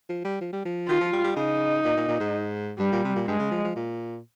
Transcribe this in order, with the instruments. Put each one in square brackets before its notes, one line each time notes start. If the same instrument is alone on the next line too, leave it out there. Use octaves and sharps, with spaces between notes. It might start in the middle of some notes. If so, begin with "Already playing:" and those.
[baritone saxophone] F3
G3
F3
G3
F3
[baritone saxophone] D#3 [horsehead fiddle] F4
[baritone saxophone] F3
G3
G3
[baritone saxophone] C#3 [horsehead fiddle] D#4
[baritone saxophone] A#2
A#2
A#2
G#2
[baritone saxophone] G2 [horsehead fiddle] G3
[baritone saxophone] A#2
C3
A#2
[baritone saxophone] G2 [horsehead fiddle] G#3
[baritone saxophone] C#3
F3
F3
A#2